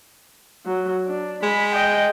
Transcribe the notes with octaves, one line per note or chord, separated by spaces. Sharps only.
F#3
D4
G#3 B5
D#5 G5